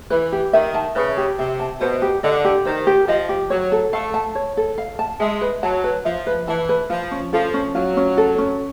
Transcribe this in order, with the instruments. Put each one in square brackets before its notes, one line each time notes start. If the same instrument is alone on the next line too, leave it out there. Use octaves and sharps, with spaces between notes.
[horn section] E3 [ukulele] B4
[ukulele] G4
[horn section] D#3 [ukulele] E5
[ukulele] A5
[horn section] C#3 [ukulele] B4
[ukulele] G4
[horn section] C3 [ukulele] E5
[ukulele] A5
[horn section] B2 [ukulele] C5
[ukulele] G4
[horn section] D3 [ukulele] D#5
[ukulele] G4
[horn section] D#3 [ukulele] C5
[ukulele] G4
[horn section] F3 [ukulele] D#5
[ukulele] G4
[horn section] F#3 [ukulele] C#5
[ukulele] A4
[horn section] A3 [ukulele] F5
[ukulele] A5
C#5
A4
F5
A5
[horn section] G#3 [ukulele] E5
[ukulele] B4
[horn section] F#3 [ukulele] A5
[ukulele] B4
[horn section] F3 [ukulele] E5
[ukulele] B4
[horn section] E3 [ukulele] A5
[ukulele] B4
[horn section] F3 [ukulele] F4
[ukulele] C#4
[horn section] F3 [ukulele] A4
[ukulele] C#4
[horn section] F#3 [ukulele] F4
[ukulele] C#4
A4
C#4